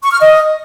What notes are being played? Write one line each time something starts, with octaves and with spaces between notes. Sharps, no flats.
C#6
F6
D#5